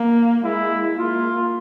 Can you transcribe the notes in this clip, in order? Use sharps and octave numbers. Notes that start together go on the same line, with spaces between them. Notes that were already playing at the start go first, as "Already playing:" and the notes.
Already playing: A#3
G#3 E4
A#3 F4